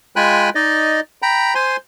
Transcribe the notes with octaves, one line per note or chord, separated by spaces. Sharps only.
G#3 F4 G5 G#5 B5 F#6
D#4 D5 D#5
G5 A#5 B5
C5 G#5 C6